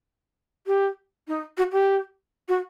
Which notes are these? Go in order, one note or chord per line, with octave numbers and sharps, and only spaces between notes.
G4
D#4
F#4
G4
F#4